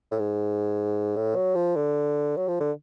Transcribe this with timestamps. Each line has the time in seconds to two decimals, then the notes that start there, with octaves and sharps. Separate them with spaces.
0.11 A2
0.19 G#2
1.16 A2
1.36 F#3
1.55 F3
1.76 D3
2.37 F#3
2.48 F3
2.60 D3